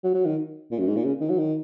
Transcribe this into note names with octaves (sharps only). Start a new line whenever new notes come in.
F#3
F#3
D#3
A#2
F#2
G#2
A#2
C#3
D#3
F#3
D#3